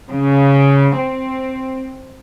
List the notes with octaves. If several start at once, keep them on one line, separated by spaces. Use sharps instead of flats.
C#3
C4